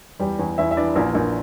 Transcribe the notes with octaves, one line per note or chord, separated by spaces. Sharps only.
E2 G3 G4
E2
E2 E4 E5
E5
E3 D4 D5
A#1 A#3 A#4
A#1